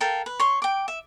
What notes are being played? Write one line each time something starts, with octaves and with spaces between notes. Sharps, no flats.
A4 A#4 F5 G5
B4
C#5 C6
G5 D6
E5